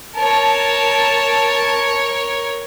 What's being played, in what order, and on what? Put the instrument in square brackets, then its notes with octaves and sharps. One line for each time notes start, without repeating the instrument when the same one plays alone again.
[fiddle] A#4 C#5 [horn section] A5